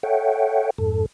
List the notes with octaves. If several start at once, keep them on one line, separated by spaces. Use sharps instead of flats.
A4 C#5 E5 F#5 G5
F2 G#2 A4